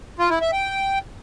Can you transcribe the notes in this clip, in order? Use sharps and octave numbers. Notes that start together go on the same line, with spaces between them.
F4
E4
E5
G5